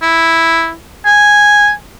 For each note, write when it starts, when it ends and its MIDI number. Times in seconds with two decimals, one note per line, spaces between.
0.02 0.72 64
1.06 1.71 80